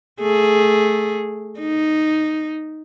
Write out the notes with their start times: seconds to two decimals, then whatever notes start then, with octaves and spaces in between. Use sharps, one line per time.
0.21 A3 G#4
1.59 D#4